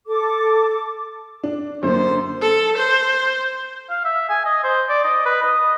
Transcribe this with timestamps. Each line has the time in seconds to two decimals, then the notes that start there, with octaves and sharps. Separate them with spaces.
0.08 A4 D6
1.44 D4
1.83 F#2 D3 A#3 C5
2.41 A4
2.77 C5
3.90 F5
4.05 E5
4.29 G#5
4.45 D#5
4.64 C5
4.89 D5
5.04 D#5
5.25 B4
5.42 D#5